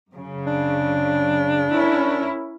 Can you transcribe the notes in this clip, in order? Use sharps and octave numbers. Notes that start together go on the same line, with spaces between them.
F#2 C#3
D4
C#4 E4 A#4